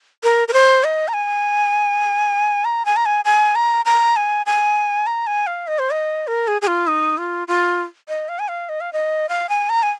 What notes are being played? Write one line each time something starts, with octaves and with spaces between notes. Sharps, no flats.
A#4
A#4
C5
D#5
A#5
G#5
A#5
G#5
A#5
G#5
G#5
A#5
A#5
G#5
G#5
A#5
G#5
F5
D#5
C5
D#5
A#4
G#4
G#4
F4
D#4
F4
F4
D#5
F5
G#5
F5
D#5
F5
D#5
F5
G#5
A#5
G#5